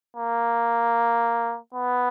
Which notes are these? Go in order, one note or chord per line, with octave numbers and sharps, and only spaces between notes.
A#3
B3